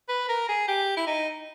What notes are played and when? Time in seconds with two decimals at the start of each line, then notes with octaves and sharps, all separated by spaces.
0.09 B4
0.29 A#4
0.49 G#4
0.68 G4
0.97 E4
1.07 D#4